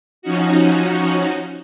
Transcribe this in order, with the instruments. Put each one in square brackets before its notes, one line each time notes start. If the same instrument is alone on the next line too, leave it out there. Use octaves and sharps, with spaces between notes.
[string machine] F3 C#4 D#4 F#4